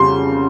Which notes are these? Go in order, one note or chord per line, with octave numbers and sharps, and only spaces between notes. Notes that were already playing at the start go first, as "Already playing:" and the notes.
Already playing: F2 C#3 G3 C6